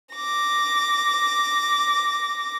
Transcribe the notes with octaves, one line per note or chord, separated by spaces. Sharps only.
D6 A#6